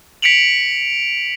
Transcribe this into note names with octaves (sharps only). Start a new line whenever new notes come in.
B6 C#7 D7 F7 F#7